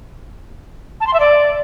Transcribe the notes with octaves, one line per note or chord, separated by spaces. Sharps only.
A5
C6
E5
D5